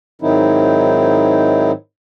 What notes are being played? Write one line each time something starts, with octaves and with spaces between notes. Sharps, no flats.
G#2 D#3 F#3 C4 D#4 E4